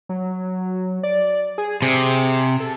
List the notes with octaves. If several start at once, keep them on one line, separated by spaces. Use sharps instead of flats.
F#3
D5
G#4
C3 G#4
A4